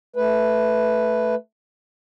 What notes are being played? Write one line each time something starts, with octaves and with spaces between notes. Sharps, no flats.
A3 B4